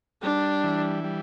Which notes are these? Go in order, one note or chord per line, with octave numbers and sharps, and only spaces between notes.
G3 D4
E3
G3